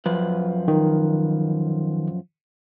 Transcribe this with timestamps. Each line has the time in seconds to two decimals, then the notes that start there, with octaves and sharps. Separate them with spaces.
0.06 F#2 F3 B4
0.68 D#3